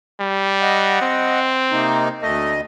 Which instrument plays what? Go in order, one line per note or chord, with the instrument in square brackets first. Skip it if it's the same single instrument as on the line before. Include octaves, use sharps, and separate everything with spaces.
[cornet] G3
[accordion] D#5 F#5
[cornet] C4
[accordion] C3 A#3 D#4
[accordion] D2 D#5 [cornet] A3